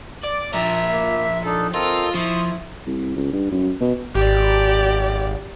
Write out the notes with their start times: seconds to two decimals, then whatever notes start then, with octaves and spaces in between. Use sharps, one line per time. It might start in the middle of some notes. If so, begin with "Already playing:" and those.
0.23 D5
0.53 F3 A#4 E5
0.91 A#3
1.46 D4 D#4 A4
1.74 C4 F4 A4 A#4 D#5
2.15 F3 E4 C6 C#6 D#6
2.86 C2
3.17 C#2
3.33 G2
3.52 F#2
3.81 B2
4.15 G#1 G4 D5